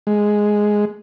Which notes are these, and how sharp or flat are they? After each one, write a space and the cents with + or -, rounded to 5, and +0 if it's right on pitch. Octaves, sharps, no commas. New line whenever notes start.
G#3 +5